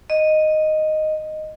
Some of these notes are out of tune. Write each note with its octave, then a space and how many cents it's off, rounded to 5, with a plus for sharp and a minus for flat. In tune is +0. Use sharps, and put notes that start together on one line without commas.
D#5 -5